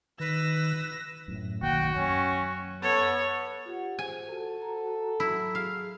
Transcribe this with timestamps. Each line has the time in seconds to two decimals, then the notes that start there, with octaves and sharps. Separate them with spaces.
0.20 D#3 B4 E6 A#6
1.28 F#2 A2
1.62 B1 D#3 A#3 F#4 G5
1.96 F#2 C#4
2.82 B3 A4 C#5
3.66 F4 G4 F#5
3.99 G#4 C5 G#5
4.29 F#4 A4
4.62 A#5
5.20 F#3 E4
5.55 G#4 F5